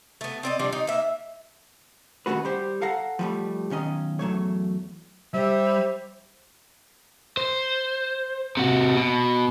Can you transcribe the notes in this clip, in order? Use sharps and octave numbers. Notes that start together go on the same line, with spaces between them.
A3 B3
C4 D5 D#5
F3 G3 A#3 D4
D#4
A#3 E5
D#2 C#3 F3 A3 F#4 B4
G3 G4 C5
A4 F5 F#5 A#5
F3 G3 A3
B1 D#3 C#4 D#5
E2 F#3 A3 C#5
G3 G4 C5 E5
C5
C3 F#4
B2